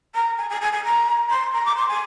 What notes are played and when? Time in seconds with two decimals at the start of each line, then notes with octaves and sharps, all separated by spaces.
0.15 A#5
0.38 G#5
0.49 G#5
0.61 G#5
0.72 G#5
0.84 A#5
1.30 C6
1.53 A#5
1.65 D6
1.76 C6
1.88 G#5